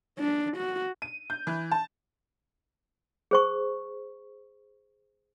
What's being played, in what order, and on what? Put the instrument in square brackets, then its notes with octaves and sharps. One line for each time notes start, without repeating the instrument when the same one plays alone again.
[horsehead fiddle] D4
F#4
[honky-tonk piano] D#7
G6
E3
A5
[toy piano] G#4 C5 C#6